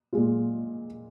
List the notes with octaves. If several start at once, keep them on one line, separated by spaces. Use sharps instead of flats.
A#2 G#3 F4